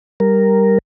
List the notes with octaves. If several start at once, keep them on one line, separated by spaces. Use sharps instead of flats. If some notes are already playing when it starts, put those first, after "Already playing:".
G3 A#4